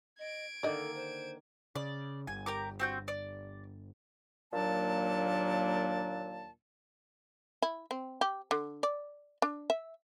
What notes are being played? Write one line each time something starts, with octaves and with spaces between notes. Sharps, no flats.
D#5 G#6 D7
D3 D#3 A#3 A4 D5 D#5
C5
C#3 D5
G1 G#5
G4 A#4 D6
C4 F#4 G6
D5
D#2 A#2 F#3 A#3 D4 A5
E4
C4
G4
D3
D5
D4
E5